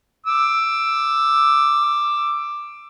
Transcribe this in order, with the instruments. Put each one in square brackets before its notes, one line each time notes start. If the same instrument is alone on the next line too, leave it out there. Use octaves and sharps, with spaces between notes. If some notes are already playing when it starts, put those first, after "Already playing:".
[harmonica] D6 E6